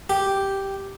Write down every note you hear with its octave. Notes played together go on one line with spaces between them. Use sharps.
G4